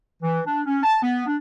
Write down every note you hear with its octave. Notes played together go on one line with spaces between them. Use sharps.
E3
D4
C#4
A5
B3
D4